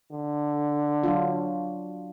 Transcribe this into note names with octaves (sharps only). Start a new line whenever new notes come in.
D3
F#3 D4 F4